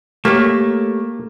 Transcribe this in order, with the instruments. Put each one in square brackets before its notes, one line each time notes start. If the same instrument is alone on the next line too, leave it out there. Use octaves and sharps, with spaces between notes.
[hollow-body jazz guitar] A3 G4 C#5 [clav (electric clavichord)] A#3